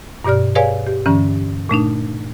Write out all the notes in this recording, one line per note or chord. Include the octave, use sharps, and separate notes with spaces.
G2 B2 G4 D5 F6
G#4 B4 C#5 D5 F5 G#5
G4
G2 D3 E3 C#4
A#2 A3 D4 D#4